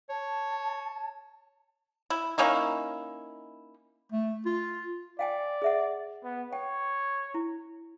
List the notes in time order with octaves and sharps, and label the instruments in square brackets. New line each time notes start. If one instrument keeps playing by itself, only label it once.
[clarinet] C#5 [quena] A5
[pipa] E4
A#3 C#4 D#4 E4
[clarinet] A3
F4
[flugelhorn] D5 [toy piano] F5 G5 G#5
[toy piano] G#4 E5 F#5
[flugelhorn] B3
[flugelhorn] C#5 [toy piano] G5
[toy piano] E4